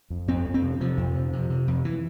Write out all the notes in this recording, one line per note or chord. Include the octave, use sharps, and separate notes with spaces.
F2
F2 C4
F2
C4
C3
C3 F3
F2
C3
C3
C3
F2
E3